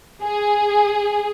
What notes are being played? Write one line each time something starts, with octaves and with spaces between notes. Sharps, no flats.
G#4